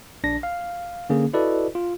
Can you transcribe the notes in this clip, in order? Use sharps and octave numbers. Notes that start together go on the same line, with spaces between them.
A#1 D4 A#6
F5
D3 A#3 C#4 G#4
E4 F#4 A4 B4 D5 D#5
F4